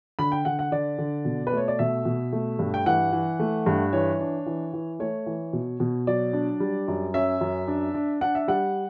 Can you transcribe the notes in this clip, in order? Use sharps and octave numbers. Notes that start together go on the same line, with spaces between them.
D3 B5
G5
D3 F#5
F#5
D3 D5
D3
B2
B4
A3 C#5
D5
B2 E5
B2
A3
G2
G5
E3 F#5
E3
A3
G2
E3 C#5
D4
E3
E3
A3 C#5
E3
B2
B2
F#3 D5
D4
G3
F#2
C#4 E5
F#2
D4
D4
D4 F#5
E5
G3 F#5